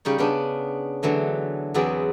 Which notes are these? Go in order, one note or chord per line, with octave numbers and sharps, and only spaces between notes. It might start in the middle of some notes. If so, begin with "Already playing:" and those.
C#3 G3 D#4 C#5
C#3 B3 C#4 D4
D3 E3 F#3 A3
E2 F#3 B3 C4 G#4 D5